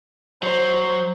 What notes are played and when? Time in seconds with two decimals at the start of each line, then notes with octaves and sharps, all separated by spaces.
0.43 F#3 C5